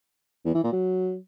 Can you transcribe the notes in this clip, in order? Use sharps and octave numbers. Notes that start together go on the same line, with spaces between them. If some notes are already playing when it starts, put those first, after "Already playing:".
E2
E3
A#2
F#3